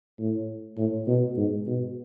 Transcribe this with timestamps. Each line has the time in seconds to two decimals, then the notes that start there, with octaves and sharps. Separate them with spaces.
0.19 A2
0.78 A2
1.07 B2
1.37 G#2
1.67 B2